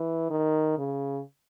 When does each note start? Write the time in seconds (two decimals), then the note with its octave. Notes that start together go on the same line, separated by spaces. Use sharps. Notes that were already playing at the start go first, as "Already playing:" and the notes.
Already playing: E3
0.30 D#3
0.78 C#3